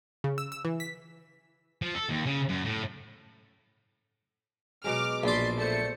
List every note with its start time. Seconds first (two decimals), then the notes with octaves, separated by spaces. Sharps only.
0.24 C#3
0.38 E6
0.52 E6
0.65 E3
0.80 B6
1.82 F3
1.94 A4
2.09 D#2
2.26 C#3
2.49 F#2
2.65 A2
4.84 B2 F#3 G#3 D6 F6
5.24 A#1 D5 C6 D6 B6
5.58 A3 C5 D5 C#7